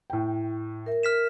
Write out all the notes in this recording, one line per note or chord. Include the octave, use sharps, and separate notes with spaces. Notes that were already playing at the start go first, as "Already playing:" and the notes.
A2 G5
A#4 E5
F6 B6 E7